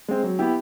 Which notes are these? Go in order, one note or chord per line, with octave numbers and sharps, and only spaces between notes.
G#3 C4
F#3
B3 E4 G4